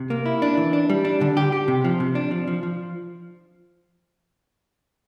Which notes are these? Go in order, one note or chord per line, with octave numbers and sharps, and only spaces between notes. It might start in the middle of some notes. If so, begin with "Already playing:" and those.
Already playing: C3
A#3
E4
D4
E3
D4
G3
D4
D3
G4
G4
C3
F3
C3
D4
F3
F3
F3